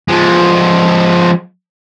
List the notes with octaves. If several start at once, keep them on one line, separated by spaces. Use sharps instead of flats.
F3 G#3